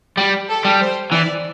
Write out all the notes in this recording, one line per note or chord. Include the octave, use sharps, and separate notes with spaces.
G3 G4
A4
G3
C5
E3 D5